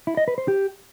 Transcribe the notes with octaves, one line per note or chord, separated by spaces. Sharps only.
E4
D#5
B4
C5
G4